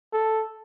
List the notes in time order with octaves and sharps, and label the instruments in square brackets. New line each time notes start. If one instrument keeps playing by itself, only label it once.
[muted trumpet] A4